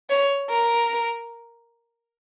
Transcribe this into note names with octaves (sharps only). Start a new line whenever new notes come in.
C#5
A#4